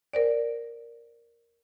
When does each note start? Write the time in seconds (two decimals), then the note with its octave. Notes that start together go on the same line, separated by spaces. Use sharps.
0.13 A#4 C5 D5